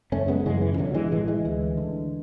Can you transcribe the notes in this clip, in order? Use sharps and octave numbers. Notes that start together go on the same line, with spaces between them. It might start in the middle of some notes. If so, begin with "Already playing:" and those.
F#1 A3 C#4
G#3 B3
F#2 C#3 E3 G#3
E3
E3
B1 D3 F#3
E3 G#3
A2 E3 G#3
E3 G#3
D2
D3